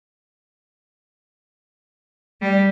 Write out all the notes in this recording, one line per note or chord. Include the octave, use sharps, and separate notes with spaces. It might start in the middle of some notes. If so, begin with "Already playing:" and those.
G3